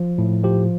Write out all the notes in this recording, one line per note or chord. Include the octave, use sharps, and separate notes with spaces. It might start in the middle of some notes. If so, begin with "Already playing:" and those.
Already playing: F3
A2
F3 G4